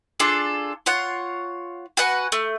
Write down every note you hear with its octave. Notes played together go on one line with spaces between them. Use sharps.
D4 F4 G#4 A4
F4 C#5 F#5
F#4 B4 F#5 G#5
A3